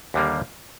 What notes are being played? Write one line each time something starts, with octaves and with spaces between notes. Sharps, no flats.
D#2 D3 G3 A#3